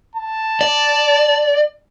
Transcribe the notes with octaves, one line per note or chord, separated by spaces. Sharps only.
A5
D5